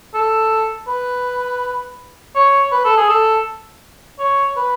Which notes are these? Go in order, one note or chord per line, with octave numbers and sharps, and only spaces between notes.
A4
B4
C#5
B4
A4
G#4
A4
C#5
B4